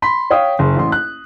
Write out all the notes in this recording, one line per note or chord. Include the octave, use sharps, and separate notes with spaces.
B5 C6 B6
C#5 F5 G5 D#6
F#1 C6
A1 C6
F#6